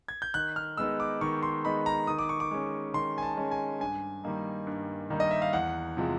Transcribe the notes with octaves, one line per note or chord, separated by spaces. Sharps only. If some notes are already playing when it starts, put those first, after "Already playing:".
G#6
G6
D#3 F#6
F6
G#3 B3 D#4 E6
D6
D#3 C#6
C6
G#3 B3 D#4 B5
A#5
D#3 D#6
D6
C#6
D6
G#3 C#4
D#3 C6
G#5
A5
G#3 C#4
G#5
G2 G#5
D#3 G3 A#3 D#4
G2
D#3 G3 A#3 D#4
D#5
E5
F5
E2 F#5
C3 F3 G#3